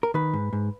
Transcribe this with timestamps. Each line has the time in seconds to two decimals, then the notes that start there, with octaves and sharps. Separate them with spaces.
0.03 A#4
0.14 D#3 B4
0.33 G#2
0.53 G#2